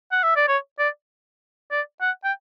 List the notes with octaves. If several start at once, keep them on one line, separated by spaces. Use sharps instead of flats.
F#5
E5
D5
C#5
D5
D5
F#5
G5